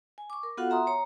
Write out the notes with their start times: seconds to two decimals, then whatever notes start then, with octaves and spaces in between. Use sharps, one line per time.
0.18 G#5
0.30 C#6 D6
0.43 A#4
0.57 B3 F4 F#4 A4 F5 F#5
0.70 E5 A#5 C6 D#6
0.87 C#5 A#5